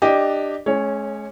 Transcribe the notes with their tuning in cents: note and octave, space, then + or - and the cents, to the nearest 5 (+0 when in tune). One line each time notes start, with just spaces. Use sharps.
D4 +20 G4 +0 D#5 +10
G#3 +40 C#4 -15 C#5 +0